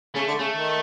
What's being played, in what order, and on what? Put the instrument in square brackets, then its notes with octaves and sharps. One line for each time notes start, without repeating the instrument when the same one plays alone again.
[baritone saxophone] C#3 [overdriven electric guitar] A3
[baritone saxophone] D3
[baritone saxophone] C#3 [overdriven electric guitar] A3
[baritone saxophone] D#3